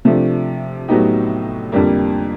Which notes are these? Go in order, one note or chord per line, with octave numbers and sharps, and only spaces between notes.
C3 F3 A3 D4
A2 F#3 B3 D#4 G4
F2 D3 G3 A#3